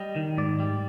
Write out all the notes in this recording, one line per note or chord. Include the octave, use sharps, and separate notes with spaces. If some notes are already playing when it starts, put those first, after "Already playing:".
Already playing: G3 D#5
D#3
G#2 D5
G3